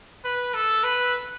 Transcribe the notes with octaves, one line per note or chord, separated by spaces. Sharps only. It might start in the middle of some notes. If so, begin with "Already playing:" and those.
B4
A4
B4